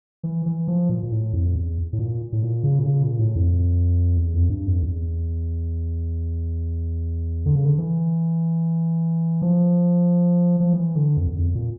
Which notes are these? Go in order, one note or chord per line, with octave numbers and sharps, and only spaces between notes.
E3
E3
F3
A#2
A#2
A2
F2
E2
A2
A#2
A2
A#2
C#3
A#2
C#3
A#2
A2
F2
E2
F2
G2
F2
E2
D3
C#3
D3
E3
F3
F3
E3
D3
F2
E2
F2
A#2